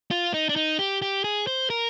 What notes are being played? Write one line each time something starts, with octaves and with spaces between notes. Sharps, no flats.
F4
D#4
D4
D#4
G4
G4
G#4
C5
A#4